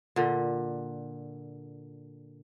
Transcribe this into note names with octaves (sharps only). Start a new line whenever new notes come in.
A#2 D3